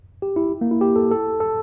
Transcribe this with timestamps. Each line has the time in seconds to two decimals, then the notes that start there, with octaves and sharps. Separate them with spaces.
0.22 G4
0.36 E4
0.61 A#3
0.71 E4
0.81 G4
0.96 A4
1.11 A4
1.40 A4